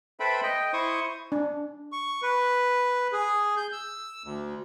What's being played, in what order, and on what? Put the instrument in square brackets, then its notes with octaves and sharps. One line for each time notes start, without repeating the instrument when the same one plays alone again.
[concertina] A4 B4 C5 E5 G5 B5
D#5 G5
E4 C5 C#6 D#6
[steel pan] D4
[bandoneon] C#6
B4
G#4
G6
E6
D2